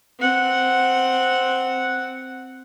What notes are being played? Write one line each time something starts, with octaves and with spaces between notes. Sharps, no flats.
C4 F#5